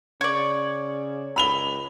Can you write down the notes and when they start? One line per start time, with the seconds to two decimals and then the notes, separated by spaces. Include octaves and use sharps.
0.21 C#3 C#5 D5
1.36 C#2 B5 F7 G7